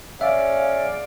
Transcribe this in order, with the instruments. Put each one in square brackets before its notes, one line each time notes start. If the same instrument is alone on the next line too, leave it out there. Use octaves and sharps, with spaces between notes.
[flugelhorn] C#4 [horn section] G#4 D5 F5 [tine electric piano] E5